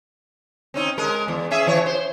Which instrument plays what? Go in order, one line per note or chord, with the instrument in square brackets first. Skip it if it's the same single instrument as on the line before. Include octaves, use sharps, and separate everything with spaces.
[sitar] C4 C#4 D#4
G#3 A#4
E2
C#4 G#4 E5
E3 C#5
C5